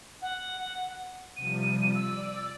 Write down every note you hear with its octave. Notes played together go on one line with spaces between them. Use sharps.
F#5
C3 F3 G3 D#7
D5 E6